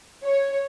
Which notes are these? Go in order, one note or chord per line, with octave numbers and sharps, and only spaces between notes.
C#5